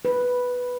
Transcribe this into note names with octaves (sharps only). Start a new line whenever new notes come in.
B4